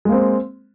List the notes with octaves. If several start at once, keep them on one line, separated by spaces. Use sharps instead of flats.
G#3 A#3 C4